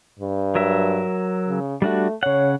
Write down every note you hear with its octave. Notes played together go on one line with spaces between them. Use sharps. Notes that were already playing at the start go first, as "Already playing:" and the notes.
G2
F#3 A#4 E5
C#3
G3 A3 D4 F#4
C#3 C#5 F#5